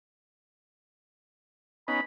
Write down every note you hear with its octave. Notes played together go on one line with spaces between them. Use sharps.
B3 C#4 D#4 B5